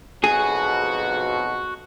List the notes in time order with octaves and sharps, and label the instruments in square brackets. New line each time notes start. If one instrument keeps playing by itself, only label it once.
[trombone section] B1 F2 B2 [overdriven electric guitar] F#4 [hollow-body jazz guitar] G#4